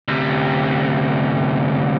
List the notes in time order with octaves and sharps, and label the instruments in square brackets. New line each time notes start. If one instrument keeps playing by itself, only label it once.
[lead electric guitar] D2 C3